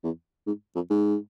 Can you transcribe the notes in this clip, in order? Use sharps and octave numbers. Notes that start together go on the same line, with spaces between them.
E2
G#2
F2
G#2